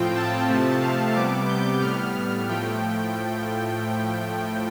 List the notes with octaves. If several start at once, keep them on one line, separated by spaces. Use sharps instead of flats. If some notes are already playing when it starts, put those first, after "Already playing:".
Already playing: A2 F3 C4 F4 G5
A5
C3 F3 A3 C4
F5
C3 G3 B3 D6
G6
A2 G3 B3 F6
A2 F3 A3 G5